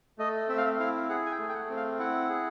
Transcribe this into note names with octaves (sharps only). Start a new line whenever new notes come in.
A3 D#5
C4 E5
F5
E5
E4 F5
G#4 F#5
G#5
G5
A3
G5
F#5
C4
F5
E4 F#5
G#4